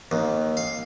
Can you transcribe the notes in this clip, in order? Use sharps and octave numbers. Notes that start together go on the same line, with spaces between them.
D#2
F5